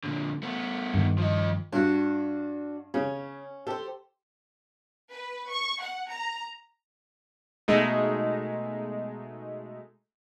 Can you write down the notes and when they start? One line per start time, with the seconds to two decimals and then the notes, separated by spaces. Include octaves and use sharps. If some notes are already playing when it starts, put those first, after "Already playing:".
0.04 A#2 D3
0.43 A3 B3
0.94 G2 D#3
1.18 F3 D#5
1.72 G2 D4 F#4
2.94 C#3 C#4
3.67 G4 A4 C5
5.11 B4
5.50 C#6
5.80 F#5
6.11 A#5
7.68 B2 G#3 A3 D#4